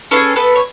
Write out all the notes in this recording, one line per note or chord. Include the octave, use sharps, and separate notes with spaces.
C#4 F4 G#4 A4 B4
B3 A4 B4
C#5